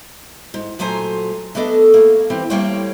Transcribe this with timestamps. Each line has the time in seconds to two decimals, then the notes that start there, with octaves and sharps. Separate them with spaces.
0.54 G#2
0.79 A#2 F#3 A3 C5 G#5 A#5
1.55 A3 B3 D4 A4 D#5
1.94 A3 A#3
2.30 E3 C4 G4 C5
2.50 G3 A3 A#3 C5 C#5 G5